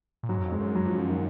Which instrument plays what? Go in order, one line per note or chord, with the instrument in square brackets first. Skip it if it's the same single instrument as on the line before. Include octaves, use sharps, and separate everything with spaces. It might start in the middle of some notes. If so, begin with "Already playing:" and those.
[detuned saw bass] A#2
[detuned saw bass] G#2 [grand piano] F#3
[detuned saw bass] F#2
F2
[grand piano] G#3
[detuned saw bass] F#2
[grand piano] F#3
F3
F3
D#3